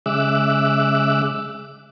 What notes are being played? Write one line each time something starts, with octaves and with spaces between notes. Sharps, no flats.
C#3 G#3 E5 D6 E6 F#6